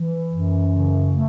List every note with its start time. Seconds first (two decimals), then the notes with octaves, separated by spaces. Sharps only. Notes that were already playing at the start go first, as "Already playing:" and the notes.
Already playing: E3
0.30 F#2
0.71 C#3
1.11 A3